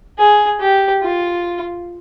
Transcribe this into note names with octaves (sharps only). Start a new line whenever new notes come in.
G#4
G4
F4